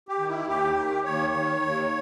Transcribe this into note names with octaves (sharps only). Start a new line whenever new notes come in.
G4
D#3
E4
D#2 G4
D#3
D#2 C#5
D#3
D#2